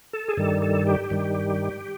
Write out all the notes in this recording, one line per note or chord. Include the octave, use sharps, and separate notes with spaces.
A4
G#4
G2 D#3 G3 A4
A4
G4
G2 D#3 G3